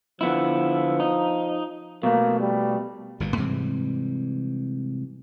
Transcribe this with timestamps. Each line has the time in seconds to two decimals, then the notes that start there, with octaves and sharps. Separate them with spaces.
0.21 D3 F3 B3 E4
1.00 D#4
2.03 B2 A3 A#3
2.40 G3
3.20 G1 G2 A#2
3.37 G#2 C3 E3 G3